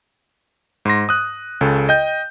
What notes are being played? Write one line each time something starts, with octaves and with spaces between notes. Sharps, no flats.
G#2 C6 A#6
D#6 F#6
C#2 C#3 A4
D#5 G5 G6